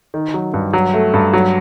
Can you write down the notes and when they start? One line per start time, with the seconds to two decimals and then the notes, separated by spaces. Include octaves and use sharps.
0.14 D#3
0.34 F#3
0.54 G2
0.73 F#3
0.94 A3
1.14 G2
1.33 F#3